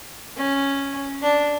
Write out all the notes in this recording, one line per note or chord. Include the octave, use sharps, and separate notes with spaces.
C#4
D4